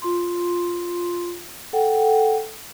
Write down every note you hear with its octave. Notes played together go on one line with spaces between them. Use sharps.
F4 C6
A4 F#5 G5